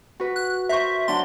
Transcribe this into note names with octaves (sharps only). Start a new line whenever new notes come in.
F#4 B4
F#6
A#4 C5 E5 C#6
F#3 D4 F#5 C6